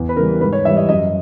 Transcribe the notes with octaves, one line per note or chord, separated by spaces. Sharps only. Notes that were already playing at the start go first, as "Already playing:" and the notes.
Already playing: E2
B4
C#3 E3 G3 A#4
G#2 B4
C#5
E3 G3 E5
D#5
F#2 D#5